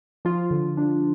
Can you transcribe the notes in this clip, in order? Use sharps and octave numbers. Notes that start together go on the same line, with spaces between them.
F3 F4
D3
D4